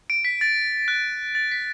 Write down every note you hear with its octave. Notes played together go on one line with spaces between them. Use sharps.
D7
B6
A6
F#6
A6
B6